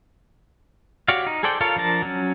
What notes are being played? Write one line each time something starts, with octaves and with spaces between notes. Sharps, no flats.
F#4 G4 C#5 D5 F5
D#4
G#4 A4 C5 D5 G5
F4 A4 A#4 C#5 F5
F3 D4 A#4 A5
F#3 C#4